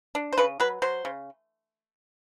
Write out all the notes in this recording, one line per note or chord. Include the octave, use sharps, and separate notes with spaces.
D4
C5
C#3 B4
F#3 B4
F#3 C5
C#3